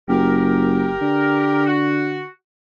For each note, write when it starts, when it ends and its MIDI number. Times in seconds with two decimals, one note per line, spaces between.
0.09 0.93 30
0.09 1.64 67
0.09 1.64 70
1.01 2.23 50
1.66 2.25 66